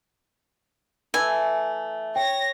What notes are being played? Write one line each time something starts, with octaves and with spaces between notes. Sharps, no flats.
E3 A3 G#5
C#5 G5 A#6